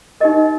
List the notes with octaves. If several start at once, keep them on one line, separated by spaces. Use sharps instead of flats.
D#4 G4 A#4 D#5